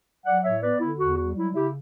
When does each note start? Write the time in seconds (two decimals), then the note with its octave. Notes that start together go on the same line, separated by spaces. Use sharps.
0.24 F#3 D5 F#5
0.43 A2 C#5 E5
0.61 B3 B4 D5
0.80 D3 E4
0.98 E2 F#4
1.17 G3 F#4
1.35 F#3 E4
1.55 C#3 E4 G4